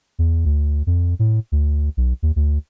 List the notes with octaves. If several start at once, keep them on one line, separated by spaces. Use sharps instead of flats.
E2
D2
F2
A2
D2
B1
D#2
D2